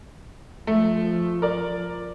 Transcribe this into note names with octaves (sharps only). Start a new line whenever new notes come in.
F3 A3
A#4 D5